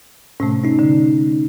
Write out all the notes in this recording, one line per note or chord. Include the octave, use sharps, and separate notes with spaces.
A2 C3 A3 C#4
C#4 D#4
D3